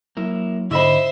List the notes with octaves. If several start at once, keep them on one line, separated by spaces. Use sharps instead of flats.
F#3 A#3 E4
G#2 D3 E4 C5 D#5 E5 B5